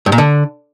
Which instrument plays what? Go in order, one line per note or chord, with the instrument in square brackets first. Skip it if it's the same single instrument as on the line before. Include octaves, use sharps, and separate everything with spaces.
[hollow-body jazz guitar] G2
A#2
D3